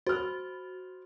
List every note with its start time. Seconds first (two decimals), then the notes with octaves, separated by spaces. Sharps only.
0.07 F#4 C5 F6